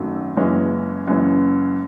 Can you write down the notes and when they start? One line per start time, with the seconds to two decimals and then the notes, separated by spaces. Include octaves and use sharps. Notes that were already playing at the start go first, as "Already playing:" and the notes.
Already playing: G#1 F#2 D#3 F#3 A3
0.37 F#1 F#2 E3 G#3 C#4
1.07 F#1 F#2 E3 G#3 C#4